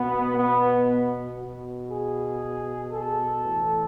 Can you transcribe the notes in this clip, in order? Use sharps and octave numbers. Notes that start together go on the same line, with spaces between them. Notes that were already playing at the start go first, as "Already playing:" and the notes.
Already playing: B2 B3
B3
B2
G#4
A4
A2 E3